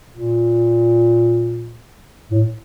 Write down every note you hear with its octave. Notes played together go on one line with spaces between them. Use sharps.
A#2
A2